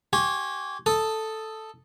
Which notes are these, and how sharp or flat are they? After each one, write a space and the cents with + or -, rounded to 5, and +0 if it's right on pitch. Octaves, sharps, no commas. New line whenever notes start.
G4 -30 G#5 -15 C#6 -45
A4 +0 D#6 +0